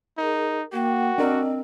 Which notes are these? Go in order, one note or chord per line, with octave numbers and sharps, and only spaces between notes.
D#4 G#4 A#4
A#3 F#4 A#4 F#5 G5
C4 D4 A#4 D#5